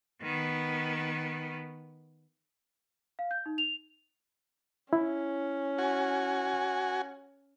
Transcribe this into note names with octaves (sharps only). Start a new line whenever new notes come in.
D#3 B3
F5
G6
D#4
F7
C#4 E4
F#4 G#5